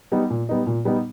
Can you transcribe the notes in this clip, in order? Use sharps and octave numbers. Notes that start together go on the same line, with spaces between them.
G3 B3 D#4
A#2
G3 B3 D#4
A#2
G3 B3 D#4